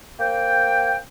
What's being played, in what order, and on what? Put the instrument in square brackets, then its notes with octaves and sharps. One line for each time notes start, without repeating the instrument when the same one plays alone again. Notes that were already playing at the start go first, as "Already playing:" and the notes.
[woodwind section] A#3 C5 G5